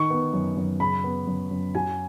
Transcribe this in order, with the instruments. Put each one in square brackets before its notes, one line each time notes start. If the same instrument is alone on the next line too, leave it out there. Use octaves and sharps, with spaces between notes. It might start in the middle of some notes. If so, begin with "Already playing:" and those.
Already playing: [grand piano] D#3 C#6
B3
F#2
F#2
C#3 B5
B3
F#2
F#2
F#3 G#5